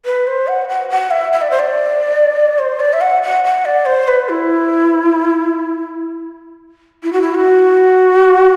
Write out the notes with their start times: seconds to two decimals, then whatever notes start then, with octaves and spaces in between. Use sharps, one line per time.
0.05 B4
0.27 C5
0.48 F#5
0.69 F#5
0.90 F#5
1.11 E5
1.32 E5
1.42 D5
1.51 C5
1.59 D5
2.59 C5
2.80 D5
2.93 E5
3.01 F#5
3.23 F#5
3.45 F#5
3.65 D5
3.86 C5
4.08 B4
4.29 E4
7.03 E4
7.13 F#4
7.22 E4
7.35 F#4